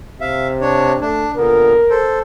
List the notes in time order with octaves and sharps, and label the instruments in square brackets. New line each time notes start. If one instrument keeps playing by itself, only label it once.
[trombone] C3 [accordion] E5 F5
[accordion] D4 C#5
[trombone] A3 [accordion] D4
[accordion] A#2 D3 B3 [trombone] A#4
[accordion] A4 C5